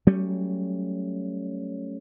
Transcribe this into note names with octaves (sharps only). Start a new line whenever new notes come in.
F#3 G3 A3 C#4